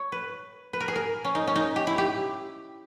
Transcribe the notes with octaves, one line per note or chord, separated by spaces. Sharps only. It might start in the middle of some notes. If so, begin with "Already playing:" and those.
Already playing: C#5
B4
B4
A#4
G#4
A#4
C#4
D#4
C#4
D#4
G4
E4
G4